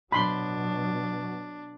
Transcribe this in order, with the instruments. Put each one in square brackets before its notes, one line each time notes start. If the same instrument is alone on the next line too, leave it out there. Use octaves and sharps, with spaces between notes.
[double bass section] B2 F#3 [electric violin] D4 [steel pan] B5 C6